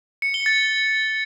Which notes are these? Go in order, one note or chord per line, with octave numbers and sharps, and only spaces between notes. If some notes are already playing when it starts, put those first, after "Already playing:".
C#7
G7
A6